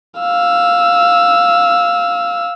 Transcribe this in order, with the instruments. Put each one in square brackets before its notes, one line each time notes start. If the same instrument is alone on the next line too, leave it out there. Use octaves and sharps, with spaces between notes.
[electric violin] F5 E6